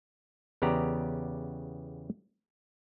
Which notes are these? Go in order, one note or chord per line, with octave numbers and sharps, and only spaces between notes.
E2 C#3 B3 G4 D5 A#5